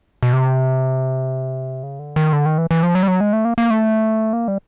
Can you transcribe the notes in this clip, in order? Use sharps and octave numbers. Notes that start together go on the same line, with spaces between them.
B2
C3
C#3
D3
D#3
D3
D#3
E3
E3
F3
F#3
G3
F#3
G#3
A3
A#3
A#3
A3
A#3
G3